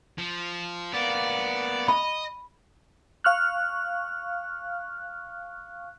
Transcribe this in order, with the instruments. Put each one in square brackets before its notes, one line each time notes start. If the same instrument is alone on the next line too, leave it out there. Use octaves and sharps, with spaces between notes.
[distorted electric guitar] F3
[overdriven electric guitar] A#3 B3 [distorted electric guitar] D5
[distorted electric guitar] D#5 [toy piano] B5
[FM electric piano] F5 C#6 F6 F#6